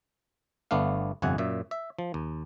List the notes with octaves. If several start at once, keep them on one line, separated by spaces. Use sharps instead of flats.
G1 A3 B3 D4 F5
G1 F2 C3 F#5 G#5
F#2 A#2 E5
E5
F3
D#2